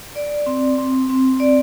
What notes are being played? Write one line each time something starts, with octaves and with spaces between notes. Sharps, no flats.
D5
C4
C4
C4
D5